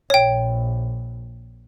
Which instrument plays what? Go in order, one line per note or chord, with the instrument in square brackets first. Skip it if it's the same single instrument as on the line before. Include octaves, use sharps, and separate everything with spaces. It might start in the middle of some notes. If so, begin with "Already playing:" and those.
[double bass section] A#1 [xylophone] C#5 G5